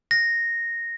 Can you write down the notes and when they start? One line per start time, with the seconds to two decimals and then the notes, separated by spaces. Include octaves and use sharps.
0.11 A#6